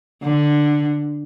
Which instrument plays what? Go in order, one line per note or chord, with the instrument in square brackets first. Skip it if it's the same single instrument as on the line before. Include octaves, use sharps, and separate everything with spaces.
[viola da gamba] D3